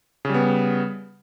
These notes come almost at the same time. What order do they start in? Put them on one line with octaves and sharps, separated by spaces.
C#3 G3 B3